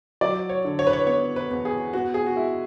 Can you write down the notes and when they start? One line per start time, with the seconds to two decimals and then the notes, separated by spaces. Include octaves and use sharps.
0.21 F#3 D5
0.50 C#5
0.64 D3
0.79 C#5
0.87 B4
0.93 C#5
1.07 B3 C#5
1.36 B4
1.50 E2
1.65 G#4
1.93 B3 F#4
2.14 G#4
2.26 F#4
2.36 G#3 E4